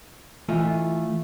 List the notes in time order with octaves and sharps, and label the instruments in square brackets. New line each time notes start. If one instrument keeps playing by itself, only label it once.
[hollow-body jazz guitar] E3 F4 D#5 [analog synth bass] A3